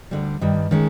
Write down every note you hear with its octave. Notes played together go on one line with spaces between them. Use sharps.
D2 D3 G3
G2 D#3 G3
D#3 G#3 C#4